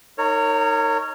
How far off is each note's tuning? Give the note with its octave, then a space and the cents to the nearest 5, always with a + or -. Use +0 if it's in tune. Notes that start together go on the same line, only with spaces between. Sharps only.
D#4 +0 A#4 -30 C#5 +0